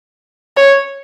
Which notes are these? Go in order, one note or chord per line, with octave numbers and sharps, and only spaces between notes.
C#5